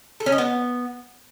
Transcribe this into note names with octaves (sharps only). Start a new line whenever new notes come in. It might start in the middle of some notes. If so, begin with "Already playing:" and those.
A4
C#4
D#5
B3